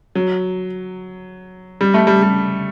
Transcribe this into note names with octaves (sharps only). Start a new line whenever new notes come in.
F#3
G3
A3
G3
G3